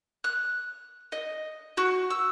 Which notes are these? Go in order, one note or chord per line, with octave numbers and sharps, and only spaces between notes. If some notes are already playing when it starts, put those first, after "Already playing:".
F#6
D#5
F#4
E6